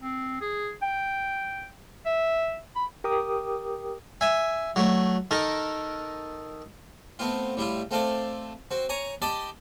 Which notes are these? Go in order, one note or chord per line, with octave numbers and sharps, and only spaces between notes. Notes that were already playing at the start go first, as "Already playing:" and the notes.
C4
G#4
G5
E5
B5
G4 A#4 G5 D6 D#6
E5 G#5
F#3 A3
D#3 A4 A#4
A3 B3 C4 F4
A2 G3 E4 F4
A3 C4 F4 A4 D5
C4 F#4
C#5 G#5 A#5 C#6
G4 D5 D#5 A5 B5